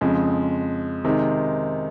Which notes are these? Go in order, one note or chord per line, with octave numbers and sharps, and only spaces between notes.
F2 C#3 G#3
C3 D#3 G#3